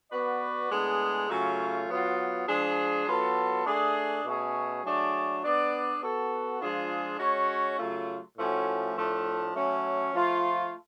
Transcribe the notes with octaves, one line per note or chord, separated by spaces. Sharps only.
B3 F#4 B4 D5
A2 G#3 B3 D4 G#4
C#3 F#3 A3 C#4 F4
F#3 B3 F4
F3 G#3 D4 G#4
F#3 B3 F4 A4
A3 D4 G#4
B2 A3 C#4 G#4
F#3 A3 D4 G#4 D5
B3 D4 G#4 D5
B3 F#4 A4
F3 G#3 D4 F4 G#4
G#3 C#4 F#4 C#5
C#3 F#3 A3 F4
A2 F3 A3 C#4 F#4
A2 F3 A3 D4
F#3 A3 C#4
F3 A3 F4